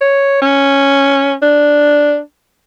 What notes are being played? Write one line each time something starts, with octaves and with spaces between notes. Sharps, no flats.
C#5
C#4
D4